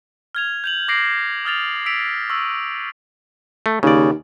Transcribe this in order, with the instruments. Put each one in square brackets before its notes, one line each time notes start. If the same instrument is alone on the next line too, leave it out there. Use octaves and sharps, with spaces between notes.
[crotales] F6 G#6 F7
G6 F7 F#7
D6 A#6 C7 D7
D#6 F6 A6 F7
E6 B6 D7 F7
C#6 E6
[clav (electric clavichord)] A3
[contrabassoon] D#2 [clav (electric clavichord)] C#3 D5